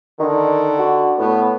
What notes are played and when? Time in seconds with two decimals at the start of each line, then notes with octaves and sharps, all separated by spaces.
0.20 D3 D#3
0.79 F#4
1.18 A2 B3